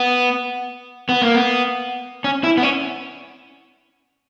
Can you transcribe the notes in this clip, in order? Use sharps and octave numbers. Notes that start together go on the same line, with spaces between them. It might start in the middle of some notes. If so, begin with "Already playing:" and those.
Already playing: B3
B3
A#3
B3
C#4
E4
B3
C#4